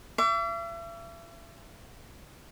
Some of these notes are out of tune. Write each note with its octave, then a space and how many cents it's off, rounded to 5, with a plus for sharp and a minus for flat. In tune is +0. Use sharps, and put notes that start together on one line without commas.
E5 +40 D6 -40